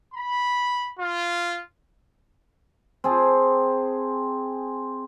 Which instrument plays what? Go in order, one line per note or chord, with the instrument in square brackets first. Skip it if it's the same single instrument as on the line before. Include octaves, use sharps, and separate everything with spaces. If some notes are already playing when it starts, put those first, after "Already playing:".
[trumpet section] B5
F4
[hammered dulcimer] C4 G#4 A5